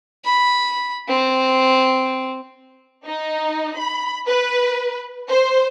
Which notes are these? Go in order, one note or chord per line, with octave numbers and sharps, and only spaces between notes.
B5
C4
D#4
B5
B4
C5